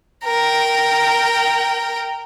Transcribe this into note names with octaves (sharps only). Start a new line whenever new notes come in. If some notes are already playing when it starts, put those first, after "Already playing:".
A#4 G5